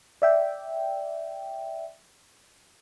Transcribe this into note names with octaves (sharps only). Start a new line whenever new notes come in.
D5 E5 G5